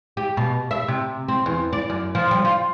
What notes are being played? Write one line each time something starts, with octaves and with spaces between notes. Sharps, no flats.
G4
B2
E5
C3
C4
E2
D5
F#2
F3
G3
F4